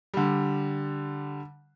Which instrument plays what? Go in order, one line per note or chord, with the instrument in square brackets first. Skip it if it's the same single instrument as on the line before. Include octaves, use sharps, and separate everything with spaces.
[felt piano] D3 G3